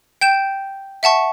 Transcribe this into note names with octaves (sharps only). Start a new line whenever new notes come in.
G5 G6 E7
E5 F#5 A5 C#6